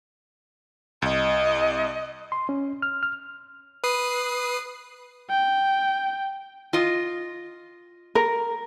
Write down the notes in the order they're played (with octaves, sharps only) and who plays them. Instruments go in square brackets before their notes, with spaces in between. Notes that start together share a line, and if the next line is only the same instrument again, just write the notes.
[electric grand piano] C2 [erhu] D#5
[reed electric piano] C6
C#4
F6
F6
[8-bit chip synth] B4 D#6 C7
[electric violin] G5
[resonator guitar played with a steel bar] F4 D#5
[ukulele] A#4